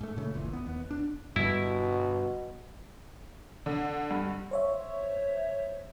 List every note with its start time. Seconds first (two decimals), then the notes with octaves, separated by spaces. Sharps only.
0.01 G#2 A3
0.17 A#2 C#3 A3
0.34 F#1 C#2 A#2 E3
0.53 B3
0.66 D#2 B3
0.91 D4
1.36 G2 B2 D3 G3 E4
3.66 D3
4.11 G2
4.51 C5 C#5 E5